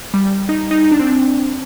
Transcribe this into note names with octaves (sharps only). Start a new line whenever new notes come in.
G3
D#4
D#4
D#4
D4
C4
D4